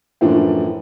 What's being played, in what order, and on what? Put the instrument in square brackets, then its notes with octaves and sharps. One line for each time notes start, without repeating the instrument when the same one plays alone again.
[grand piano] F#2 A2 E3 F3 D4